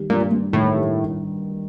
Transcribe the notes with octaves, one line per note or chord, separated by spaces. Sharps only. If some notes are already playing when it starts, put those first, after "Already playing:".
Already playing: D#3 G3
G2 A#2
G2
A2 D#3
G3